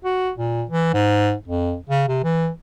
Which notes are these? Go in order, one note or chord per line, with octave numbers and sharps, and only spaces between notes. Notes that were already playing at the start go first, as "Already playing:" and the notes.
F#4
A#2
E3
G#2
F2
C#3
C3
E3